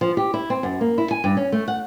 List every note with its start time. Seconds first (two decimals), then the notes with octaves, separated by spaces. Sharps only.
0.01 F3
0.17 G4
0.34 E4
0.50 C4
0.63 F#2
0.81 A#3
0.98 E4
1.11 G#5
1.24 G2
1.37 C#4
1.52 A3
1.68 F#5